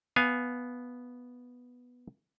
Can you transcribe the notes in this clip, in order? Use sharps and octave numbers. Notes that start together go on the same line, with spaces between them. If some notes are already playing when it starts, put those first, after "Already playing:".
B3 F5 G#5